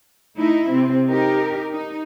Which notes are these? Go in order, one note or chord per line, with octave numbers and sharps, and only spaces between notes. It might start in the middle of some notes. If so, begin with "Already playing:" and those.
A3 D#4 E4
C3 C4
D#4 G4 A#4
D#4